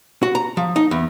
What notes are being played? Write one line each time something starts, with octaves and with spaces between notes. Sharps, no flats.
F#4
A#5
F3
D#4
E2